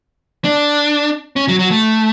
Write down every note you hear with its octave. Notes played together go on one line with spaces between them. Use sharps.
D4
C#4
F#3
F#3
A3